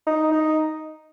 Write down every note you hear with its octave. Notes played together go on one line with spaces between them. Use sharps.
D#4
D#4